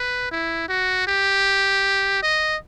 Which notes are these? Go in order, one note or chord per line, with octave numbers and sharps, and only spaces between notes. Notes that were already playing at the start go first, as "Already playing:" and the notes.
Already playing: B4
E4
F#4
G4
D#5